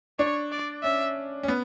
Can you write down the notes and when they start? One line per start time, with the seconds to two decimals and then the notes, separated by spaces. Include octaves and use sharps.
0.19 D4 C#5
0.52 D5
0.83 C#4 E5
1.43 C#4
1.48 B3